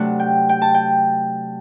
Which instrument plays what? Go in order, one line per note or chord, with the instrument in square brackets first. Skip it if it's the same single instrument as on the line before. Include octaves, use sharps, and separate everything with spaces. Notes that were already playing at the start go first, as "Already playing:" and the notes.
Already playing: [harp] C3 F#3 A3 D4 F#5
G5
G5
A5
G5